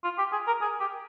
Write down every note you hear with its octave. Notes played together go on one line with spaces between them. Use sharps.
F4
G4
G#4
A#4
G#4
G4